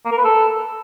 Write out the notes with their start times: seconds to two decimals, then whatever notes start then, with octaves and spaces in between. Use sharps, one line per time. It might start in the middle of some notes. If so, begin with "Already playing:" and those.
0.05 A#3
0.11 A#4
0.18 B4
0.24 A4